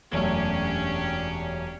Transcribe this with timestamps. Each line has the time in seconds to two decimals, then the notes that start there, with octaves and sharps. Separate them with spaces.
0.13 E1 F#2 A3 C#4 D4 G4